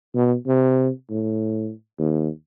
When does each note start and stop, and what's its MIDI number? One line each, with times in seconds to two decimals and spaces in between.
0.15 0.35 47
0.46 0.89 48
1.10 1.71 45
1.99 2.29 39